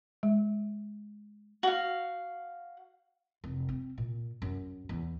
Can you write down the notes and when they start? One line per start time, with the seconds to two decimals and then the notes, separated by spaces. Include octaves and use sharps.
0.23 G#3
1.63 F#4 F5
3.44 F1
3.69 C4
3.98 A#2
4.42 F#2
4.89 E2